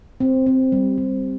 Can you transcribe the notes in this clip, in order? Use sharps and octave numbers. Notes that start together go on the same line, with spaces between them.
C4
C4
G3
G3